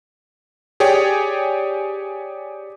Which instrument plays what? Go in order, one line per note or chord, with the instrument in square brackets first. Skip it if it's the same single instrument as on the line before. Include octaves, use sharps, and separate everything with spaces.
[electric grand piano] G4 G#4 C#5 D5 G5